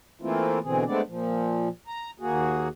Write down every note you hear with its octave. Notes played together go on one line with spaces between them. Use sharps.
E3 A3 A#3 C4 E4 F4
B2 D3 E3 C4 G#4
G#3 A3 B3 C4 D4 D5
A#2 F3
A#5
D#2 A#3 F#4 G#4